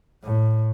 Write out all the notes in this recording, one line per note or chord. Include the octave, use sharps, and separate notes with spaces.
A2